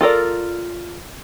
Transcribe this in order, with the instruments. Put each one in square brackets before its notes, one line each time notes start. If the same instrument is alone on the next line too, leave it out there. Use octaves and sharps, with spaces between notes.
[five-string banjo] F4 A4 A#4 D5